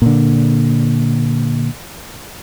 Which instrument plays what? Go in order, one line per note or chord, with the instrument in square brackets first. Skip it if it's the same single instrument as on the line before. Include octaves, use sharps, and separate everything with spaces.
[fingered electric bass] A#2 D3